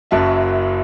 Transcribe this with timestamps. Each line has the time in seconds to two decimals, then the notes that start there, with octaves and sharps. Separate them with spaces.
0.11 F#1 F#2 F#3 E5 A5